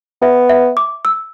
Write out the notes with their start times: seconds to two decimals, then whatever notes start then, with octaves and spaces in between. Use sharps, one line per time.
0.22 B3 E5
0.49 E5
0.77 D6
1.05 E6